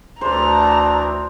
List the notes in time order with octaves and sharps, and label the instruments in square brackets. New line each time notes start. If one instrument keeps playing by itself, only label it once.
[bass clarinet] D2 [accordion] E3 A3 D4 [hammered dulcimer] C5 [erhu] A#5